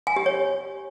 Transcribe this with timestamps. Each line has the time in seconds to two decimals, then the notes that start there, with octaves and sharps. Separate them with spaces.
0.07 G#5
0.16 G4
0.26 C#5